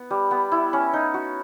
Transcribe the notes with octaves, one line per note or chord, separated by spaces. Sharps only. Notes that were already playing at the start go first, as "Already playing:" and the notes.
Already playing: B3
G3
B3
E4
C#4
D#4
F#4